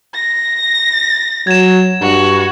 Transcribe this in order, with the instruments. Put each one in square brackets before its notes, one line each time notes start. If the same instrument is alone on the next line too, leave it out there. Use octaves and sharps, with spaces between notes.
[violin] A#6
[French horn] F#3 [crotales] G#6 E7
[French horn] G2 [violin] F#4